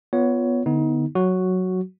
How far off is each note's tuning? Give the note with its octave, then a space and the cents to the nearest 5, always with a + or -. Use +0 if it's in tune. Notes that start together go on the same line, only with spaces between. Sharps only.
B3 +0 F4 +0 C#5 +15
D3 +0 B3 +0 D#4 +30
F#3 +0 F#4 +0